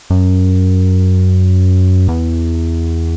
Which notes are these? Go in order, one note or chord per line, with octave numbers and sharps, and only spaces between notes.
F#2
E2